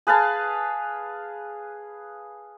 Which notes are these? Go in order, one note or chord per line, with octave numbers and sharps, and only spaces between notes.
G#4 B4 F5 A5